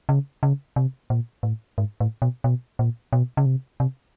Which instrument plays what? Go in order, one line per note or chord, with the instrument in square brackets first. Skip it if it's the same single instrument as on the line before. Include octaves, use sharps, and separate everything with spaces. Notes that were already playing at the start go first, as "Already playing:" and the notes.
[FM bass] C#3
C#3
C3
A#2
A2
G#2
A2
B2
B2
A#2
B2
C#3
C3
C3